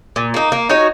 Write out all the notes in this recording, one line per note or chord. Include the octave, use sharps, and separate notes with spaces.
A#2
A#3 D#4
A#3
D#4 F#4 C#5